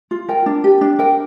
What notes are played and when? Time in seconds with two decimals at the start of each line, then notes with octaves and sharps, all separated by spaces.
0.11 F4
0.29 A#4 G5
0.46 D4
0.64 G4
0.81 D4
0.99 A#4 G5